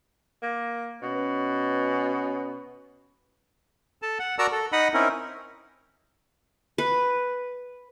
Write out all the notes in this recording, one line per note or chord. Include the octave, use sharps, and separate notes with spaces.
A#3
B2 C#4 B4
A4 A5
F#5
F#4 A#4 D5 A5 A#5 E6
A4
D#4 D#5 F#5 B5 D#6
C4 C#4 D#4 E4 A#4
B4